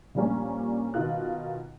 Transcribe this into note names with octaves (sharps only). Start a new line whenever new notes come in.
A#2 F3 G3 A#3 C#4 D4
B2 D#3 D#4 F4 F#6